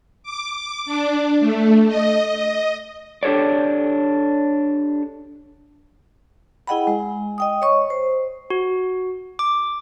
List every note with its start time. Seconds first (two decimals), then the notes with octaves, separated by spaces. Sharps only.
0.23 D6
0.55 D6
0.86 D4
1.40 A3
1.88 D#5
2.28 D#5
3.23 D4 G4 A4 C#5 D5
6.67 E4 G#4 D#5 F#5 G5 B5
6.87 G#3
7.38 D#5 G5 D#6
7.62 C#5 D#5 C#6
7.90 C5
8.50 F#4
9.39 D6